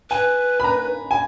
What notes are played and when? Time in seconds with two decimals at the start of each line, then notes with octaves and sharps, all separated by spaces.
0.10 B4 G#5
0.60 B5
0.64 A#5
1.11 G#5